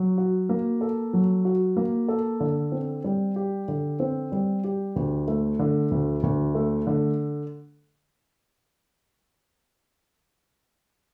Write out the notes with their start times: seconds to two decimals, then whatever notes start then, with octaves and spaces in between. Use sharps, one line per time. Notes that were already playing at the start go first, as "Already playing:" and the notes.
Already playing: F#3
0.17 F#4
0.49 A#3
0.81 A4
1.13 F#3
1.45 F#4
1.77 A#3
2.08 A4
2.40 D3
2.72 C4
3.04 G3
3.36 G4
3.68 D3
4.00 C4
4.32 G3
4.64 G4
4.96 D2
5.28 A3
5.59 D3
5.91 D2
6.23 D2
6.55 A3
6.87 D3